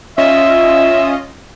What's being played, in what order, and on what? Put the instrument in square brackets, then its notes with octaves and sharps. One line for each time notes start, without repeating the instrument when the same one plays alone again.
[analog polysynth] C#4 F4 D#5 [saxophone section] E5